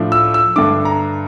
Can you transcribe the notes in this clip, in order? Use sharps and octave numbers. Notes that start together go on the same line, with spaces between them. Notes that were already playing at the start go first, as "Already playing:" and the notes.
Already playing: A2 F3 A3 D4
E6
E6
G2 D3 A3 D4 D6
A#5